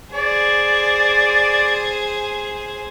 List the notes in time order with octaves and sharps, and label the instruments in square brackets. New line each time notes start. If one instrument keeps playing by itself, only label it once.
[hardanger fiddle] G#4 C5 [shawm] D5